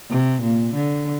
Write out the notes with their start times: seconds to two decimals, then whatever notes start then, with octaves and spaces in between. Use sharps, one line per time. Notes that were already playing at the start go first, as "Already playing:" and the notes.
0.10 C3
0.43 A#2
0.75 D3